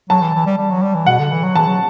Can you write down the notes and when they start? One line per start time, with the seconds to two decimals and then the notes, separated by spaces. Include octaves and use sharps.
0.10 F#3 A5
0.22 E3
0.34 E3
0.46 G3
0.58 G3
0.70 F#3
0.83 G3
0.95 E3
1.06 B2 F#5
1.19 D3
1.31 E3
1.44 F#3
1.55 E3 A5
1.68 F#3